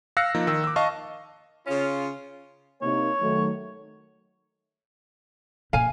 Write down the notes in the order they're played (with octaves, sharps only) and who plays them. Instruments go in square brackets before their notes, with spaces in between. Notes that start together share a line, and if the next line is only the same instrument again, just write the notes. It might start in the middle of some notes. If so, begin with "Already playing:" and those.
[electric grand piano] F5 E6 F#6 A#6 C#7
F3 A#3 D#4
D#3 E6
D6 E6
D#5 F5 A5 C#6
[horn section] C#3 C#4 F4
[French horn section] C3 A#3 D#4 [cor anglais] C#5
[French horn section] D#3 F#3 A3
[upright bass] A#2 [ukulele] F5 G#5